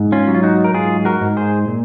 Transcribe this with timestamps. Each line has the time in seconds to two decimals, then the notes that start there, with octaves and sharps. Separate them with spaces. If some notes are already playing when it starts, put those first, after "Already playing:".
Already playing: G#2
0.12 C#4 F4
0.28 F#3
0.34 F4
0.43 D#4 F#4
0.64 A#4
0.74 G#2 F4 G#4
1.05 F#4 A#4
1.21 G#2
1.37 G#4 C5
1.68 A#2